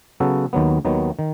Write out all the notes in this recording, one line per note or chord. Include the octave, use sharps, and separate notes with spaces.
C#3 F#3 B3 F#4 A4
D#2 D#3 F#3 B3
D#2 D#3 F#3 B3
D#3